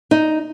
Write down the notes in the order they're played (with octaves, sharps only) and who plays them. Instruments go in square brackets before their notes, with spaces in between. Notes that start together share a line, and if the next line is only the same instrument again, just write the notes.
[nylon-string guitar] D#4